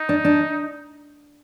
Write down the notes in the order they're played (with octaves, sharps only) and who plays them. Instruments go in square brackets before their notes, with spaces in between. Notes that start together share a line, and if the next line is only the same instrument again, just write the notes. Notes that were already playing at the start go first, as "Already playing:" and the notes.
Already playing: [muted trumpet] D#4
[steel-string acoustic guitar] D4
D4